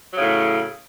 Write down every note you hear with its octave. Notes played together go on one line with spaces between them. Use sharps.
A2 C#3 F#3